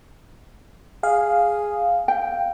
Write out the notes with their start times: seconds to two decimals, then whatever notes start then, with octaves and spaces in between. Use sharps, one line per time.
1.03 G#4 F5
2.08 G5